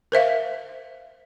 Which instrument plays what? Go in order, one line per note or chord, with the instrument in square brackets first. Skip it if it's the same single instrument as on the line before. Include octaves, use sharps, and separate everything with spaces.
[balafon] A#4 C5 E5 F5